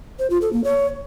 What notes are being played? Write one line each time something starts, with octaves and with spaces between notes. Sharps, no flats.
C5
F4
A4
A#3
C#5